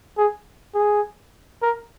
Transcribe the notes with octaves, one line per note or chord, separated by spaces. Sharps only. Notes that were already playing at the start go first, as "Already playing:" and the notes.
G#4
G#4
A#4